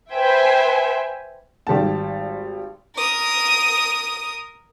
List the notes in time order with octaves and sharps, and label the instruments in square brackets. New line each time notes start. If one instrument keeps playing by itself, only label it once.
[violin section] B4 C5 E5 G5 G#5
[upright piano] G#1 G3 G5 A5
[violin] A#4 D#6